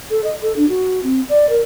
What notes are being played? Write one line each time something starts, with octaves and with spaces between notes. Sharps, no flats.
A4
D#5
A4
D4
F#4
C4
D5
A#4